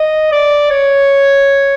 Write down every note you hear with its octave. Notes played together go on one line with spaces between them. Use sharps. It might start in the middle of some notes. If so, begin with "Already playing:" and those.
Already playing: D#5
D5
C#5